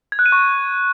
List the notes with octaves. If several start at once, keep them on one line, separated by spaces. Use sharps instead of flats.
G#6
F#6
D#7
C#6